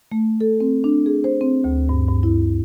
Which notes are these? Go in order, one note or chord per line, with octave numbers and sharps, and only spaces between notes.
A3
A4
C4
D4
G#4
C5
C4
D2
G2
G2
E4